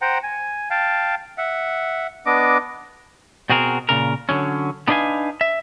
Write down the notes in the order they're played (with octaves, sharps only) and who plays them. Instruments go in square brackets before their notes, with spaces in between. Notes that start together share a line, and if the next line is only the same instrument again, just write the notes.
[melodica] C5 F#5 G5 A#5
G#5
F5 G5 A5
E5 F#5
B3 D4 D#5 D6
[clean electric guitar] B2 C4 F#4 G#4 A#4
A#2 C#3 A#4
D3 F#3 C#4
B3 D4 D#4 B4 F5 G#5
E5